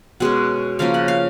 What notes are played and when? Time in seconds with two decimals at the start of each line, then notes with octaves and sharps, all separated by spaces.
0.20 B2 G#3 C#4 F#5
0.79 C#3 F3 A#3 C#4 F5
0.94 F#5
1.08 F5